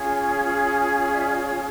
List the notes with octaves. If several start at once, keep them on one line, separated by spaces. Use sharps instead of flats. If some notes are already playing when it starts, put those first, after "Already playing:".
Already playing: C#4 F4 G#4
D5 E5
D5
C#5